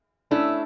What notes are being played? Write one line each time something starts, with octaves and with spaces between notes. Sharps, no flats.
A3 C#4 D4 E4